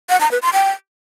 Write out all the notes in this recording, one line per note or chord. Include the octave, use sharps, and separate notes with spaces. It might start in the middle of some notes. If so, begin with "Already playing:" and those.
F#5
A#5
B4
C6
G5